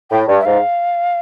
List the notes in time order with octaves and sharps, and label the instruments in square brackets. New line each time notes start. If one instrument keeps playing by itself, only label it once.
[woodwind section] A2 [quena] G5
[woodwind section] G2
[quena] E5
[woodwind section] G#2 [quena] F5